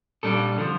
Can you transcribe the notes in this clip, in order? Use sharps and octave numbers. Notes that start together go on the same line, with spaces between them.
A#2 G3 D4 A4
D3 F3